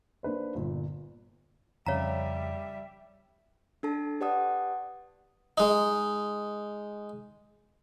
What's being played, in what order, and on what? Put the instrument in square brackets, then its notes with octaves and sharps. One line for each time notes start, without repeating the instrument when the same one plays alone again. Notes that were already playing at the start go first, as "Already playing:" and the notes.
[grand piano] A#3 D4 B4 C5
G1 A#2
[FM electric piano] F2 C#3 [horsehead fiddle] G3 E5 [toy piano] C#5 F5 A#5
[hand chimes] D4 A4 A5
G4 B4 D5 F#5 A5 D#6
[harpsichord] G#3 D#4